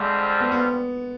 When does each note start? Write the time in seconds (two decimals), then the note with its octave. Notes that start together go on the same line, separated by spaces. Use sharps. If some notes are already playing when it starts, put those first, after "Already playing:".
Already playing: F2 D3 G3 G#3 C4 F4
0.40 B3
0.52 B3